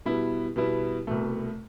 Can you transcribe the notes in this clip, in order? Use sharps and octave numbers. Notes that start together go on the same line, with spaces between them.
B2 G3 B3 E4
B2 G3 B3 E4
C2 B2 A3